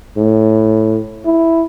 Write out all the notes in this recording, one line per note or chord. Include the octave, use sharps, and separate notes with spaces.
A2
E4